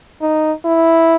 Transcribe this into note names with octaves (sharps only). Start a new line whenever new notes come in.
D#4
E4